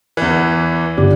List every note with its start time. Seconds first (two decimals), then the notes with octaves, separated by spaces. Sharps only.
0.17 E2 E3
0.97 G1 G4 D5